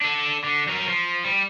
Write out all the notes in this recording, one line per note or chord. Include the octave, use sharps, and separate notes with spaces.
D4 A4
D3
F#3 A#4
F3
G3